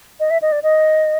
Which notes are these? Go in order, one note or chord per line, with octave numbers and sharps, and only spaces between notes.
D#5
E5
D#5
D5
D#5